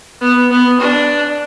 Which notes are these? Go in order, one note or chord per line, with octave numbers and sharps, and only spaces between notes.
B3
B3
D4